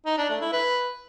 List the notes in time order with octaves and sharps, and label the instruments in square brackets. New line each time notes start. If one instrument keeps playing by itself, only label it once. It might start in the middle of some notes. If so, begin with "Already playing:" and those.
[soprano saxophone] D#4
D4
A3
E4
B4